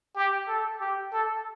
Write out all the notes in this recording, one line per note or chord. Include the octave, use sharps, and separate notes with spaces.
G4
A4
G4
A4